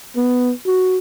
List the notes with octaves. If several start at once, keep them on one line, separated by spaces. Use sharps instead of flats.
B3
F#4